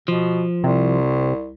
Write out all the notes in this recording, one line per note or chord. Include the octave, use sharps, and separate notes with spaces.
B2 F3
C2 C3